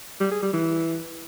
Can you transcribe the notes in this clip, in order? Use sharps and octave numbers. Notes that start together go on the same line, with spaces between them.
G3
G#4
G3
E3